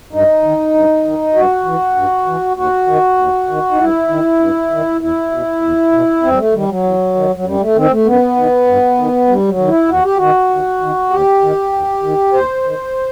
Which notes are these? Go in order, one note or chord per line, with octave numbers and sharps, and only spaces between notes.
G2 D#4
D#3
G2
D#3
G2 F#4
E3
G2
E3
D#2 F#4
D#3
D#2
D#3
D#4
G2 E4
D#3
G2
D#3
E2 E4
B2
E2
B2
E2 C4
G3
A3
D#3 G3
F#3
E2
D#3
F#3
F#2 G3
A3
D#3 C4
A3
F#2 B3
D#3
G2
D#3
G2 G3
F#3
D#3
E4
D#2 F#4
G4
D#3 F#4
D#2
D#3
D#2 G4
D#3
D#2
D#3
D#2 C5
D#3